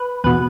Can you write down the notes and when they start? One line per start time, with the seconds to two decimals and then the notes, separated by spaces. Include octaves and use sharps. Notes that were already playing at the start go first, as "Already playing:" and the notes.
Already playing: B4
0.24 E2 B2 B4